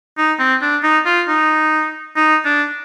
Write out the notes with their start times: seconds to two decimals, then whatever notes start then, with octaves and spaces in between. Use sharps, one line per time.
0.18 D#4
0.39 C4
0.61 D4
0.83 D#4
1.06 F4
1.28 D#4
2.16 D#4
2.45 D4